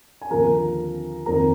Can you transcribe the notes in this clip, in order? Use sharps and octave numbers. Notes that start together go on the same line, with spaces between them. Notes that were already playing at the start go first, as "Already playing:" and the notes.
G#5
D#2 D3 F3 A#4 A#5
F2 D#3 A#4 A#5